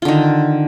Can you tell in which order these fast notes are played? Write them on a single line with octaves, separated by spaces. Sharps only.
F4 D3 D#3